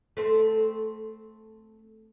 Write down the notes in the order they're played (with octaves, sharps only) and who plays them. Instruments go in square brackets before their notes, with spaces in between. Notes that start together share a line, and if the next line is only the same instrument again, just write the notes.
[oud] A3 C4